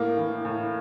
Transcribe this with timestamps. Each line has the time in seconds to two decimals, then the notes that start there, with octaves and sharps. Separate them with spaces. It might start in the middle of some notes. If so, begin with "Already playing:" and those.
Already playing: A2 A#3
0.17 E3
0.45 A2